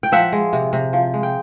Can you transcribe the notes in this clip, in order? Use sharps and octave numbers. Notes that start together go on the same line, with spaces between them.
G5
F3 E5 F#5
G#3
C3
C3
F3
G#3
G5